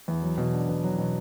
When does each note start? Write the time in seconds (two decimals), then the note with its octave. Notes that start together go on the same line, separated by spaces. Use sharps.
0.08 E2
0.23 F#3
0.38 B2
0.53 D4
0.69 B2
0.84 F#3
0.98 B2